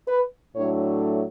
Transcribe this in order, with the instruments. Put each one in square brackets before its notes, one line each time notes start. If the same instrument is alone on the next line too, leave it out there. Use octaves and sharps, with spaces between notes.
[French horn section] B4
A2 F#3 A3 D4 C#5